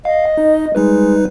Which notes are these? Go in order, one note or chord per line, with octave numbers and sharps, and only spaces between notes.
D#5 F5
D#4
G3 G#3 D#4 B4